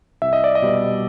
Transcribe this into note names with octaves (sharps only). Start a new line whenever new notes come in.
C2 E5
D#5
D5
D#5
B2 G3